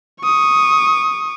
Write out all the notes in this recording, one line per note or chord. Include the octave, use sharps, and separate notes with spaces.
C#6 D#6